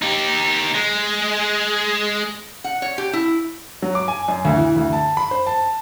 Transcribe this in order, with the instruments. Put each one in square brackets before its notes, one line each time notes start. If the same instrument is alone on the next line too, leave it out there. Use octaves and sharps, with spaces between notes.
[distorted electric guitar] D#4 G4
G#3
[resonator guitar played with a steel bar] F#5
C#5
G4
E4
[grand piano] F#3
D6
G#5
F#2
D2
E3
D2
A5
B5
C5
A5